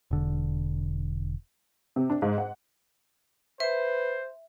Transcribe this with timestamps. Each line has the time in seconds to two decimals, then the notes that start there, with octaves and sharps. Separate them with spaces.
0.11 E1 D3
1.96 C3
2.10 D4
2.22 G#2
2.38 F#5
3.60 B4 C5 E5